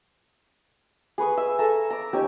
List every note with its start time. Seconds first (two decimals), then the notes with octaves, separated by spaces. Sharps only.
1.18 G#4 B4 C#6 D#6
1.37 E5
1.59 A4 E5 G#5 A#5
1.90 A#5 D6
2.13 C#4 D#4 G4 G#5